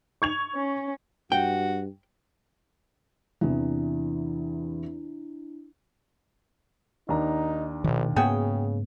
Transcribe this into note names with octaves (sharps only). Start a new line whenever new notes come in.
C#6 G#6 F7
C#4
G2 F#4 G5
E2 C3 E3 D4 E4
D#2 D4 D#4 A#5
A#1 B2 D#3
G#2 C#3 A#3 B3 F#4 G#4 G5